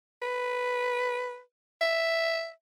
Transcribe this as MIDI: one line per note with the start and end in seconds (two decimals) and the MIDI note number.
0.22 1.41 71
1.81 2.51 76